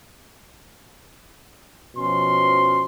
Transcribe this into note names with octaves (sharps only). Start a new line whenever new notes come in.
B2 F3 C#4 C6